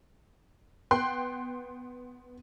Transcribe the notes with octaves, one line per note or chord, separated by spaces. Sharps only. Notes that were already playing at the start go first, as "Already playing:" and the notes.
B3 G5 C6 F#6